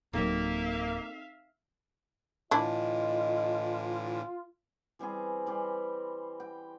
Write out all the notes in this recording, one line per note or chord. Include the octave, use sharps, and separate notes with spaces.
D1 F#3 A#3 C4 D#4 A4 E5 F5
A2 D3 E3 D4 E4 F4 D#5
E3 G3 C4 G#4
E3 G3 C4 C5
G5